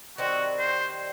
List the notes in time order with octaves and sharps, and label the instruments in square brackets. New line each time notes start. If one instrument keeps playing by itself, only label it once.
[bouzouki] D#3 G3 C4 [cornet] F#4
[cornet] C5